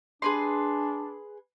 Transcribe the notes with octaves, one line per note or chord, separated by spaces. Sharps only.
D4 G#4 B4 C6